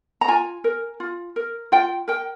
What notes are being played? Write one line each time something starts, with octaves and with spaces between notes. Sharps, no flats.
A#5
F4 G#5
A#4
F4
A#4
F4 G5
A#4 G5